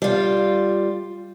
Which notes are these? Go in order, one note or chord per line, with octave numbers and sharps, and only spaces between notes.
G3 F4